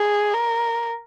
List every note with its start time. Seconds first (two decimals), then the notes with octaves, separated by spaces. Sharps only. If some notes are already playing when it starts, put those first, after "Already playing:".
Already playing: G#4
0.34 A#4